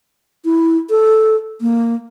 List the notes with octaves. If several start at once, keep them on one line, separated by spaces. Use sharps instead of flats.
E4
A4
A#3